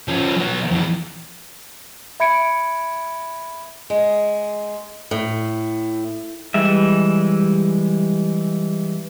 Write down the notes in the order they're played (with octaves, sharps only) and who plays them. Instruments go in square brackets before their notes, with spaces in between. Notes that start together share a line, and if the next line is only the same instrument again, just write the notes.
[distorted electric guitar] F3 C#4
F#3 B3
F2 E3
[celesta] E5 B5 G#6 C#7 D7
[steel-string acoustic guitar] G#3
A2
[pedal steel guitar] E3 G3 G#3 E5